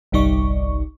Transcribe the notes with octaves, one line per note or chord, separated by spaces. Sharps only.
G1 C2 G3 D#4 D5 C#6